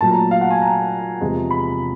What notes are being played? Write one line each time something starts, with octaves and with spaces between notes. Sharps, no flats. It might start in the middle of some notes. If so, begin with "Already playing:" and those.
A#2 F#3 A3 A5
A#5
F5
F#5
G#5
A#5
E2 C3 F3 G#3
B5